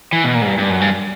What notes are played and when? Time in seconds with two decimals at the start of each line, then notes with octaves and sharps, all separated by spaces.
0.13 E3
0.24 B2
0.35 A#2
0.42 G#2
0.47 G2
0.58 G2
0.70 F#2
0.81 G2